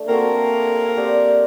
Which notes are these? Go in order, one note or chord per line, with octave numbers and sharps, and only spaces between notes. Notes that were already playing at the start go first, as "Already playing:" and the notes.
Already playing: A3 D4
A#3 C4 F#4 A4
C4 G4 D5